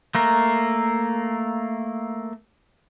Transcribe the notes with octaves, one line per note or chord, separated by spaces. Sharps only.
A3 A#3 A#4